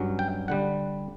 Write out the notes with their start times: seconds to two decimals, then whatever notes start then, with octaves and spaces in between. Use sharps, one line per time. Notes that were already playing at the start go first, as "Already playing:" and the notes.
Already playing: G2 F#3 C#4
0.19 G5
0.48 D3 G3 F#5